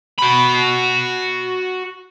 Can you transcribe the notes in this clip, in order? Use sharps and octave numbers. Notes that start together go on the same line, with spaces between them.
F#4 B5